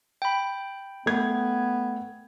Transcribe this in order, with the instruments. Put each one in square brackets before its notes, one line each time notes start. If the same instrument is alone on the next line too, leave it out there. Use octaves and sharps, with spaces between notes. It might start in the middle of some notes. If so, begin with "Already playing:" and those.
[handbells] G5 B5
[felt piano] A3 G#6 [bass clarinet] B3